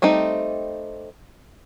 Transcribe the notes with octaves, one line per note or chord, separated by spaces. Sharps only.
G3 A3 C4 D#4